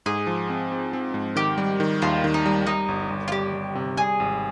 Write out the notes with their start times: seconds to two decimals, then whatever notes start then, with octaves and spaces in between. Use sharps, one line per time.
0.06 G#2 G#4
0.27 F3
0.50 C4
0.72 C4
0.93 C4
1.14 G#2
1.36 D#3 G4
1.58 G3
1.80 D#3
2.02 D#2 F4
2.24 D#3
2.34 D#4
2.46 G3
2.67 G3 D#4
2.88 G1
3.10 G1
3.28 F4
3.32 G3 G4
3.53 G3
3.75 C3
3.97 G3 G#4
4.20 G#1